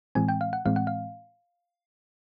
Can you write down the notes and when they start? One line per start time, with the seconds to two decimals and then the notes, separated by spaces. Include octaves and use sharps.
0.15 A2 E3 G#3 C4 G#5
0.28 G5
0.41 F5
0.53 F#5
0.65 A2 E3 G#3 C4 F5
0.76 F#5
0.87 F5